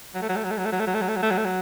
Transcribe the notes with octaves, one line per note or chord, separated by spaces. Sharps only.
F#3
A3
F#3
A3
F#3
A3
F#3
A3
F#3
A3
F#3
A3
F#3
A3
F#3
A3
F#3
A3
F#3